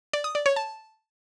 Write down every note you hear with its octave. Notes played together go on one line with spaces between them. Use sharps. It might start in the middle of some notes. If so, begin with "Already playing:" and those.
D5
D#6
D5
C#5
A5